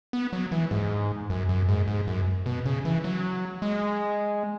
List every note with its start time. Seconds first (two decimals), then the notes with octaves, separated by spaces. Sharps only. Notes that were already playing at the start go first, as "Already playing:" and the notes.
0.13 B3
0.33 F#3
0.52 E3
0.71 G#2
1.30 F#2
1.49 F#2
1.69 G#2
1.88 G#2
2.07 F#2
2.46 B2
2.66 C#3
2.85 E3
3.04 F#3
3.62 G#3